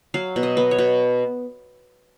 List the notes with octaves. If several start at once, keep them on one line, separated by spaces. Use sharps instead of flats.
F#3 F5
B2
D#5
B3
C#5
B2